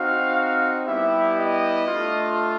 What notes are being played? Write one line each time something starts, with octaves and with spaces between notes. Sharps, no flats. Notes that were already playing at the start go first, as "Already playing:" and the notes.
Already playing: C4 D#4 F#4 F5
G3 B3 E4 G4 E5
D#5
A3 D4 F4